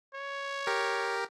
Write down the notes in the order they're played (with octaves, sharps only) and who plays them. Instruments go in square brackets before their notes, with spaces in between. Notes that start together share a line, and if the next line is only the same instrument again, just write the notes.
[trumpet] C#5
[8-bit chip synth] G4 A#4